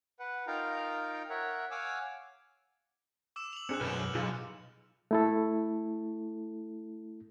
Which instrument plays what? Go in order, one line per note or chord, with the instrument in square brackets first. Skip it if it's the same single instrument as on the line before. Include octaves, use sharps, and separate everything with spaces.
[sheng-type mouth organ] B4 F#5
D#4 F4 A#4 F5 G5 A#5
A#4 C#5 E5 F#5
C#5 F5 F#5 G#5 D6 E6
[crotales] D6 E6 E7
F7 F#7
[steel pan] C4 D4 G#4 [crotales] F#6 C#7
[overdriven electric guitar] B1 F#2 [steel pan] B4 [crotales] F6 E7
[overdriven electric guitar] B1 [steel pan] D#4 F4 G#4
[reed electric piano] A3 E4 A4